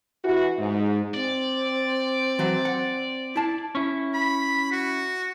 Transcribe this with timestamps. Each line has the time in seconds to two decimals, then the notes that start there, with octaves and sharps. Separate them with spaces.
0.24 E3 F#4
0.59 G#2
1.14 C4 D5
2.39 E3 F#3
2.65 F#5
3.36 E4 A5
3.75 C#4 E4
4.14 B5
4.72 F#4